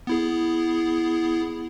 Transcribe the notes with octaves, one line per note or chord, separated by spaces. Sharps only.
B3 E4 G#4